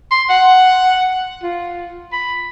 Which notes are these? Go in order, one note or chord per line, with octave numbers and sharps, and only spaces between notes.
C6
F#5
F4
B5